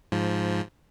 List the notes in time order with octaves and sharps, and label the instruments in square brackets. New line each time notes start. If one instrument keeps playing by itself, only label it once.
[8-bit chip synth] G#2 F3